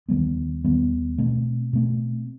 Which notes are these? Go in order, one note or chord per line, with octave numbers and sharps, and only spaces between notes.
D#2 D#3 G3 B3
D#2 D#3 G3 B3
B2 A3 C4
B2 A3 C4